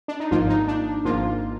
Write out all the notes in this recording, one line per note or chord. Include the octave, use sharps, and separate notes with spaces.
D4
D#4
G#1 G#2 F3 A#3 F4
D#4
D4
G#1 G#2 F3 A#3 F4